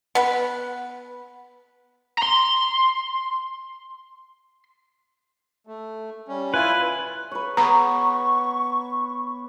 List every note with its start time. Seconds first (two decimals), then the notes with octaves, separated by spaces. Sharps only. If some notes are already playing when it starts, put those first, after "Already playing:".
0.15 B3 B4
2.18 A#5 C6
5.67 A3
6.28 G3 C#4
6.54 E4 F4 B4 G#5
7.31 B4 C#5
7.57 B3 A#5 C#6